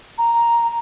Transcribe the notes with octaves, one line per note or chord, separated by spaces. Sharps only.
A#5